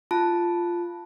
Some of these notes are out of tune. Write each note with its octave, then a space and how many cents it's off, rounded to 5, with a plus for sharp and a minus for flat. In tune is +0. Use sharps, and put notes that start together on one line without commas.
F4 -10 A5 +0